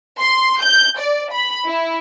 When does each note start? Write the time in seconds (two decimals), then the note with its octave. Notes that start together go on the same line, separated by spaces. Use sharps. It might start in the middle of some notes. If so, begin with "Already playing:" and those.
0.20 C6
0.61 G6
1.00 D5
1.32 B5
1.67 E4